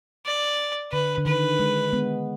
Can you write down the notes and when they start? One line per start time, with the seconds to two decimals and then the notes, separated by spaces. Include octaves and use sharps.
0.26 D5
0.92 D3 B4
1.18 D3
1.26 D#3 B4
1.59 G#3
1.93 G#3 B3